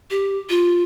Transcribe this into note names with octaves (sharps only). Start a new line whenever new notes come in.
G4
F4